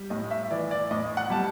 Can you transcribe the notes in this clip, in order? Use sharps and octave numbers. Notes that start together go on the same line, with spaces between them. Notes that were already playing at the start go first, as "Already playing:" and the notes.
Already playing: G3
A2 D#5
E5
E3 D5
D5
A2 D#5
F#5
G3 A5